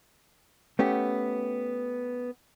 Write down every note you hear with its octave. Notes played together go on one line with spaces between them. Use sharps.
A3 B3 C#4 G4